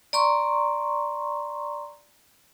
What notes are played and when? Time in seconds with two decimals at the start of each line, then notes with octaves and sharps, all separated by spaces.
0.13 D5 A#5 C6 C#6